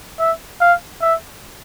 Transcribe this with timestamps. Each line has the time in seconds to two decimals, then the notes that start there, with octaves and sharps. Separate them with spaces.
0.19 E5
0.61 F5
1.01 E5